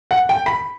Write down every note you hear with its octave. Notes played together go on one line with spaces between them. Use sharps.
F#5
G5
B5